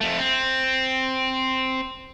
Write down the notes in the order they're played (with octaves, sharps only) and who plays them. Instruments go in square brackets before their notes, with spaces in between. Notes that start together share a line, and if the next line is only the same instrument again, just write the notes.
[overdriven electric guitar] F2 A3
C4